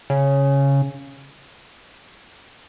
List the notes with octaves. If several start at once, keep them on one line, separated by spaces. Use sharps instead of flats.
C#3